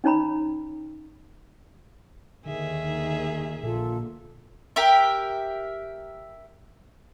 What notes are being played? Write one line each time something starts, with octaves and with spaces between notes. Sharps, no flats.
C#4 D#4 C#5 A#5 B5
D#2 D3 D#3 G#4 E5
A#1 A#2 D3 A#3 F4 A4
G4 A#4 E5